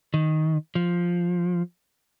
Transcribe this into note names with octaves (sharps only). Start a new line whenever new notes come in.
D#3
F3